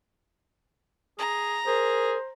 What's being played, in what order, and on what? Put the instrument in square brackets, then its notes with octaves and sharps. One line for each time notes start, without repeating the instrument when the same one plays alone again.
[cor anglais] G#4 [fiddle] A#5
[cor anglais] G#4 [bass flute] A#4 [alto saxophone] C5